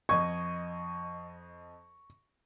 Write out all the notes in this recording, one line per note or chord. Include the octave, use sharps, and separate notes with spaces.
F2 D#5 C#6 G#6